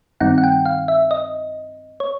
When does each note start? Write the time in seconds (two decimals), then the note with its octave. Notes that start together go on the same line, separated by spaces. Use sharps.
0.20 G2 D#3 G3 C4 D#4 F#5
0.38 F#5
0.44 G5
0.65 F5
0.88 E5
1.11 D#5
2.00 C#5